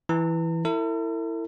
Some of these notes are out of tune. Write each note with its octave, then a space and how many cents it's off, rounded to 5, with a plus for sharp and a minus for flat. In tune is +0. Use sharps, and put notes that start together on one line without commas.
E3 +0 A#5 -45
E4 +0 A4 +45